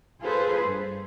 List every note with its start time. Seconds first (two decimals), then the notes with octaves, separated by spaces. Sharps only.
0.21 F4 G#4 A4 B4 C5
0.65 G2